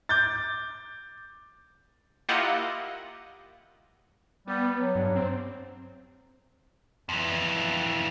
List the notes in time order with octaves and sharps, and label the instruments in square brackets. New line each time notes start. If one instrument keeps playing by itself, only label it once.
[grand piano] D6 G6 A6
[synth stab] A#3 E4 F4 G4 D#5 F#5
[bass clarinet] G3 [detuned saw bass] B3
[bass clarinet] F#3
[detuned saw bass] G2
C4
[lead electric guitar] F2 E3